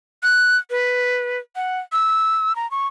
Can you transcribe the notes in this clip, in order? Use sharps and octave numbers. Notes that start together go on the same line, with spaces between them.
F#6
B4
F#5
E6
A#5
C#6